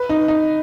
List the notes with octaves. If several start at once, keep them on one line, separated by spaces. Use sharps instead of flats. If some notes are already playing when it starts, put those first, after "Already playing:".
Already playing: B4
D#4
D#4